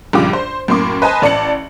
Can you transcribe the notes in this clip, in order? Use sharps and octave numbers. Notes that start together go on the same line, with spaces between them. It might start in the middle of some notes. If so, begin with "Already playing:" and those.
A#1 G2 C#3 F4 G4 D6
C5
F#2 A2 A#3 C6 D6
B4 C5 D#5 G#5 A5
A1 D5 A5 C#7 F#7